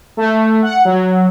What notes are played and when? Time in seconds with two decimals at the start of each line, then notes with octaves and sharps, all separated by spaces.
0.17 A3
0.62 F#5
0.85 F#3